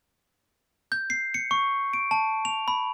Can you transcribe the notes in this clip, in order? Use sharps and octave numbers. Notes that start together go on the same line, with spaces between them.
G6
C7
C#7
C#6
D7
A5
F7
B5